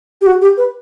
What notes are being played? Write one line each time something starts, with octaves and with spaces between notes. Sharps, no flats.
G4
F#4
G4
B4